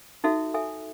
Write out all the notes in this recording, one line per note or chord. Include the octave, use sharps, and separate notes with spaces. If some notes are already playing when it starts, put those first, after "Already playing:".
D#4 F#4 A4 E5
A4 E5 G#5